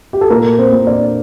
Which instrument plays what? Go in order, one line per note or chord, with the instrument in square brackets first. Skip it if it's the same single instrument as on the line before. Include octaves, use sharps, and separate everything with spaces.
[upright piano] G4
A4
A#2 A#3 A#4
C4 C5
A#2
D4 D5